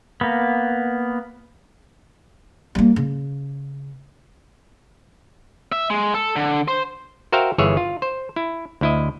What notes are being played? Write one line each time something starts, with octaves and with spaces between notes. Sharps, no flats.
A#3 B3
G3 A#3
C#3
E5
G#3
A4
D3
C5
F#4 A#4 C5 E5 F5 G5
G1 E3 G#4 C#5 E5
F4
C5
E4
D2 E4 D#5